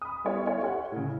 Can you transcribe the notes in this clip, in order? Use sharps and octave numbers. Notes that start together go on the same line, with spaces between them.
B5 D#6
G3 B3 E4 C#5
C#5 F5
G4 C#5 F#5
A2 C#3